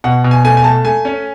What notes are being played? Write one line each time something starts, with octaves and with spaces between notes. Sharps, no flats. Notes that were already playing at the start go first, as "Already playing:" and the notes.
B2 F#5
B2
G#5
A3 G#5
G#5
A3 A5
A3 G#5
C#4